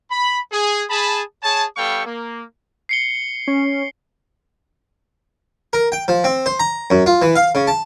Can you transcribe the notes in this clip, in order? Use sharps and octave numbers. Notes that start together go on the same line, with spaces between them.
B5
G#4
G#4 A5 B5
G#4 C#5 G#5 A5
G3 B3 A4 F5 G5 C#6
A#3
C7 C#7 G7
C#4
A#4
G5
F3
C4
C5
A#5
F#2
F4
E3
F5
C#3
A5